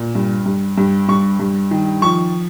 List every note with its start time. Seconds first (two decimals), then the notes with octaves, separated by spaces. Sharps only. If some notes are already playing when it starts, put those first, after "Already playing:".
Already playing: A#2
0.15 G2
0.46 G2
0.78 G2
1.09 G2 C#6
1.40 G2
1.71 D#3
2.02 F3 C#6